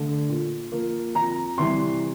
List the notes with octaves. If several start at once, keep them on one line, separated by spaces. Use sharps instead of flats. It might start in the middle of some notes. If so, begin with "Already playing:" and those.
Already playing: D3 A3
A#2
F3 A#3
F2 A#5
C3 E3 G3 C6